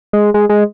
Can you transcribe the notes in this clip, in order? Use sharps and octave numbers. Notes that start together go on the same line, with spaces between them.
G#3
G#3
G#3